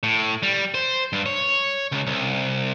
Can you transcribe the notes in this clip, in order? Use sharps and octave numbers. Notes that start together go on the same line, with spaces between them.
A2
G3
C5
G2
C#5
C#2
C2